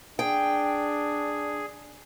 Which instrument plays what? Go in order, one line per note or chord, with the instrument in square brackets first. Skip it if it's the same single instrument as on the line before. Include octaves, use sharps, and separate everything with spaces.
[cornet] D4 [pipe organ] G#4 [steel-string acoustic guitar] G5